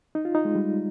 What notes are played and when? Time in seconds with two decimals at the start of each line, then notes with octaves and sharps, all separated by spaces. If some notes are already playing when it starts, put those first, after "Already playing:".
0.15 D#4
0.25 F4
0.35 D#4
0.45 G#3
0.55 G3